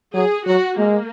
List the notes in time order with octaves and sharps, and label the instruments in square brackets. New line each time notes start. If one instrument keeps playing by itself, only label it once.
[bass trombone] F#3 [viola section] G#4
[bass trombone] F#3 [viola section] F#4
[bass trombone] G#3 [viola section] A#3